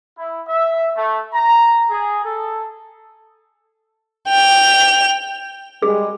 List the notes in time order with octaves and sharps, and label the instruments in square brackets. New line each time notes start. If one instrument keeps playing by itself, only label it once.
[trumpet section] E4
E5
A3
A#5
G#4
A4
[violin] G5 F7
[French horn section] G3 G#3 [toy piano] G#4